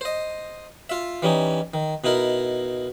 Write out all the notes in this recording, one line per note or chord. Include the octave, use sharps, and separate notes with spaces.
C5 D#5
F4 E5
E3 G3 C#4 D#4
D#3
B2 D#4 E4 A#4